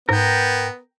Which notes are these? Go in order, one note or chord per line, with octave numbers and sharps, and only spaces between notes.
G#2 B3 A#4 G5